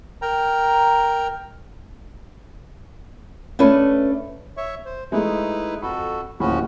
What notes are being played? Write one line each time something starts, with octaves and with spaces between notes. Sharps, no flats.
A#4 G5 A#5
A3 C#4 D4 B4
C#5 E5 C#6
C5
G#3 A3 D#4 E4 B4
F2 F#4 A4 B5
D1 D#2 F3 C#4 F#4 B5